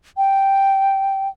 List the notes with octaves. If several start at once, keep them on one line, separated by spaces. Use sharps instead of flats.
G5